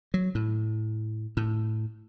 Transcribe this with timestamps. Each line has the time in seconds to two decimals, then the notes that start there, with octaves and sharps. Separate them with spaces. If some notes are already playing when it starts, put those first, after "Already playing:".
0.14 F#3
0.35 A2
1.37 A2